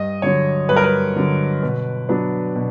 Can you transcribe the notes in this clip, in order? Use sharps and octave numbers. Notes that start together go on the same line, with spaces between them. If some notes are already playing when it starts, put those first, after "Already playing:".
Already playing: G2 D#5
D3 F#3 C#5
G2 B4
A#4
B4
D3 F#3
B2
F#3 B3 D4
B2